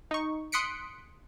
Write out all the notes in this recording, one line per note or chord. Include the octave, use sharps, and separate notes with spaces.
D#4 C#6
C6 D#6 F#6 B6 C#7 D7